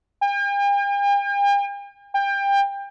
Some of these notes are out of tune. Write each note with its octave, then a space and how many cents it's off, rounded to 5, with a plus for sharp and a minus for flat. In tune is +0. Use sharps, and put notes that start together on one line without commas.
G5 +45
G5 +25